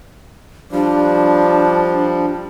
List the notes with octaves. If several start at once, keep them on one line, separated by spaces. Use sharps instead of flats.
F3 G3 D4